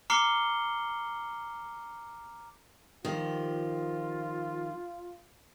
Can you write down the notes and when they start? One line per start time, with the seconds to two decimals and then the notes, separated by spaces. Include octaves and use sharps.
0.10 A#5 D6 F6 C7 C#7 G7
3.04 D#3 F3 F4 G4